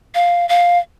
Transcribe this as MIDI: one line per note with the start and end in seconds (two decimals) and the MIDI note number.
0.15 0.48 77
0.49 0.78 77